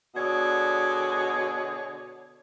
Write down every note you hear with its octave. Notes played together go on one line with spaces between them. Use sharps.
B2 D3 G#4 C#5 D5